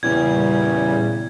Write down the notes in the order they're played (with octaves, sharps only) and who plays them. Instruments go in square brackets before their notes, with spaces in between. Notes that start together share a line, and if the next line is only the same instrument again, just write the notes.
[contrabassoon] E2 [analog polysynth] A#2 C#3 G3 [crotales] G#6